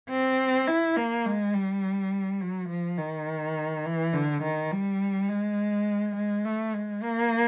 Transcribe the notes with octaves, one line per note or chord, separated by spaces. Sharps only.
C4
E4
A#3
G#3
G3
F#3
F3
D#3
E3
D3
D#3
G3
G#3
G#3
A3
G#3
A#3